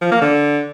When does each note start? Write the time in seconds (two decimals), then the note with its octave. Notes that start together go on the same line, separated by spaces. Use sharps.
0.02 F3
0.12 A#3
0.21 D3